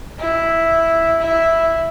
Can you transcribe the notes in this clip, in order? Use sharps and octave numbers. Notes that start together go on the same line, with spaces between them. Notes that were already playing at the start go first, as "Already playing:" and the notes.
E4
E4